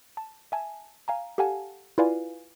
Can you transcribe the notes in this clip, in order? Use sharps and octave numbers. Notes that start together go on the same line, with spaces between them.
A5
E5 G#5 A5
F5 G#5 A#5
G4 A4 F5 F#5 G#5 A5
E4 F4 B4 D5 F5 G#5